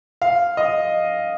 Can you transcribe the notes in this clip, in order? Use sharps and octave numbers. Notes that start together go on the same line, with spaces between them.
F5
D#5